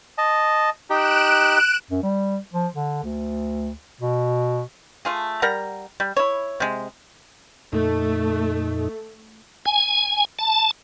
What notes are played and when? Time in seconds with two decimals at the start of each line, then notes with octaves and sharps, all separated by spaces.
0.18 D#5 A5
0.90 D#4 G4 F#6 D7 E7
1.91 F#2
2.03 G3
2.53 F3
2.74 D3
3.04 D2
4.01 B2
5.05 A3 F4 G#4
5.42 G3 A#4 F#5 A#5
6.00 G3
6.17 E4 C#5
6.60 C3 G#3
7.73 F2 A#2 A3 D#4
9.66 G#5
10.39 A5